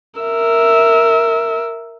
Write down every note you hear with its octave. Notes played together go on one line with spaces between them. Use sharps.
A#4 E5